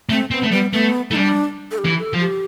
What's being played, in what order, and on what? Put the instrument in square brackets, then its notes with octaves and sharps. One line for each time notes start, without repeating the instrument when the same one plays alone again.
[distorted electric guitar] A3 [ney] C4
[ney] B3 [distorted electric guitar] C4
[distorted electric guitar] A3
[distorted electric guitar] G3 [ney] B3
[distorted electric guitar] A3 [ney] B3
[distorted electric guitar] A3 [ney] E4
[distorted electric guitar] G3 [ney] D4
[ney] A4
G4
[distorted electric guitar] E3
[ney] A4
[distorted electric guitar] F3
[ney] G4